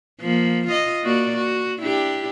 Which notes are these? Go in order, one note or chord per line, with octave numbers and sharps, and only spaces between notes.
F3 A#3
F4 D#5
A#3 F#4 D5
F#4
D4 E4 G4